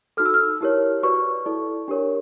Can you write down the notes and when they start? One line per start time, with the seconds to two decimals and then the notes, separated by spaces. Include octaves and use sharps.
0.17 D#4 F#4 A4 F6
0.26 E6
0.34 F6
0.61 E4 G4 A#4 C#5
1.03 F#4 B4 D5 C#6
1.46 E4 A4 D5
1.88 D4 G4 A#4 C#5